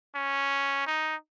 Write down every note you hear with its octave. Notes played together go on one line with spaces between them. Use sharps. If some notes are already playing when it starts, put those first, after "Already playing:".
C#4
D#4